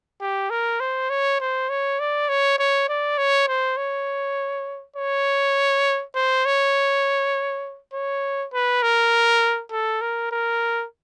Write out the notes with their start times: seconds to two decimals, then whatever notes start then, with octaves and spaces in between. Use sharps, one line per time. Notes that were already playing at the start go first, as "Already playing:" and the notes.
0.21 G4
0.50 A#4
0.80 C5
1.09 C#5
1.40 C5
1.69 C#5
1.99 D5
2.29 C#5
2.58 C#5
2.88 D5
3.18 C#5
3.47 C5
3.77 C#5
4.96 C#5
6.15 C5
6.45 C#5
7.93 C#5
8.53 B4
8.82 A#4
9.71 A4
10.01 A#4
10.31 A#4